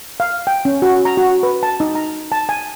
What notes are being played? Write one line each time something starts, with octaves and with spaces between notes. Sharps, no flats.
F5
G5
C#4
F#4
A#5
F#4
B4
A5
D#4
A#5
A5
G#5